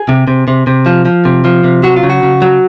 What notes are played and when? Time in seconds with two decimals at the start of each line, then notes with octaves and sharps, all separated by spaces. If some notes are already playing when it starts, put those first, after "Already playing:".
Already playing: G#4
0.09 C3
0.27 C3
0.48 C3
0.67 C3
0.86 F3
1.05 F3
1.25 C3
1.45 F3
1.64 C3
1.83 F#3 F#4
1.96 F4
2.03 C#3
2.10 F#4
2.23 C#3
2.42 F#3